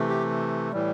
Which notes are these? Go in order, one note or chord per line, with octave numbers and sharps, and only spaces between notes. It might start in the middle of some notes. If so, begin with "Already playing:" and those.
Already playing: C3 E3 A3
G4
A2 E3 G3